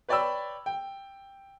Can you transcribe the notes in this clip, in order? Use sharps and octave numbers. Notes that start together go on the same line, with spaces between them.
B4 C#5 D5 G5 B5 E6
G5